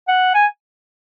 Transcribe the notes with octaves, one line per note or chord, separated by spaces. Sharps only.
F#5
G#5